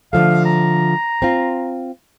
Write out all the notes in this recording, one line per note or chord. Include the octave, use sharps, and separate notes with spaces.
D3 F3 A3 F5
A#5
C4 F4